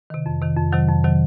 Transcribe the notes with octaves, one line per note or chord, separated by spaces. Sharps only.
C3 D#3
F2
C3 D#3
F2
C3 D#3 F#3
F2
C3 D#3 F#3